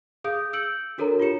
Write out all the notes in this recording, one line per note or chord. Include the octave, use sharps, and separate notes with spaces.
G#4 F5 D#6 G6 D7
E6 G6 C#7 D7 F#7
D4 F#4 A4 A#4 C#5 A#5
D4 F4 G4 C#5 C#7 E7